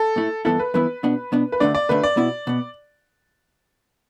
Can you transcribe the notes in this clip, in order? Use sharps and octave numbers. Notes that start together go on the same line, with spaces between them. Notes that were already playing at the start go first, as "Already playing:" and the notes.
Already playing: A4
A2 A3 E4
G2 E3 B3 E4 A4
B4
G2 E3 B3 E4 B4
B2 B3 D4
B2 B3 D4
B4
D2 D3 A3 D4 D5
D5
D2 D3 A3 D4 B4
D5
B2 B3 E4
B2 B3